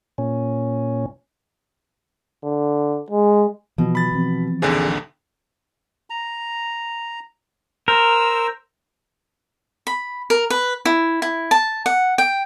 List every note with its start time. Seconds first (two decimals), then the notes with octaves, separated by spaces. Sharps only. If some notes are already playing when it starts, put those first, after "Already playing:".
0.18 A#2 C#4
2.44 D3
3.10 G#3
3.78 B2 E3 F3
3.95 B5 A6
4.12 E3 F3 C4
4.62 A#1 D#2 D3 G#4 D5 G5
6.10 A#5
7.88 A#4 C5 E6
9.87 B5
10.30 A#4
10.50 B4
10.85 E4
11.22 E4
11.51 A5
11.86 F#5
12.18 G5